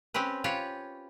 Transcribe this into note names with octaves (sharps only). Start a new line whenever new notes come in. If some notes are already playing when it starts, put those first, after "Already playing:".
C4 C#4 G4 B4
F4 G4 B4 C#5